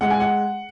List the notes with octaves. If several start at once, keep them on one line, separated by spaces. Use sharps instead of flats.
G#3 F#5
G#5
F#5